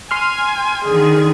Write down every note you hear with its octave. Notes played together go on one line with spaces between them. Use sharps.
G#5 C6 F6
D3 D#3 G#4